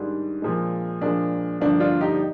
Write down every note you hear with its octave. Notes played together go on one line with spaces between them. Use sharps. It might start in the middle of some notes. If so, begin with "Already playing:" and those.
Already playing: G#2 D#3 G3 D4
A#2 F3 G#3
A#2 F3 G#3 D4
G2 D3 F3 A#3 D4
D4 F4
D#4 G4